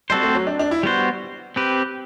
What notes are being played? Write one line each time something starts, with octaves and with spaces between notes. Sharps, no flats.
G3 C4 F#4 A4 C5
A3
F#3
D4
D4
E4
G3 B3 F#4 C5
C4 G4 B4